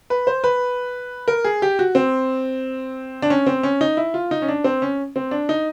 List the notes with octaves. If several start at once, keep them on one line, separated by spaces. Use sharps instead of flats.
B4
C5
B4
A#4
G#4
G4
F#4
C4
D4
C#4
C4
C#4
D#4
E4
F4
D#4
C#4
D4
C4
C#4
C4
D4
D#4